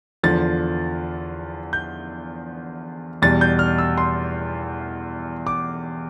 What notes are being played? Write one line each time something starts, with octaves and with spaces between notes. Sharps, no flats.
E2 D3 F3 A6
G6
E2 B2 G3 A6
G6
F6
E6
C6
D6